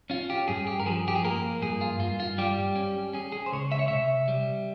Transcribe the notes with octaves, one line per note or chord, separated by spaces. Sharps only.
C#4 F4
G4
G2 G#4
G4
A#4
F3 G#4
G4
G#4
A#3 A#4
G2 G#4
F4
G2 F4
F4
G3 G4
C#4
C#4 G#4
G#4
C5
C#2 C#5
E5
C#5
C3 E5
G3